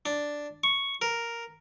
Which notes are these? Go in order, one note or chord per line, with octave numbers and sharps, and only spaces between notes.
D4
C#6
A#4